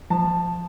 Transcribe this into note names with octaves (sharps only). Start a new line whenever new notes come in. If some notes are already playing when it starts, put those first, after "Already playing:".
F3 A5